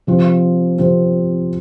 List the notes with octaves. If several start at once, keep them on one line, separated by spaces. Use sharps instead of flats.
C3 F3 C4 F4
C3 F3 C4 F4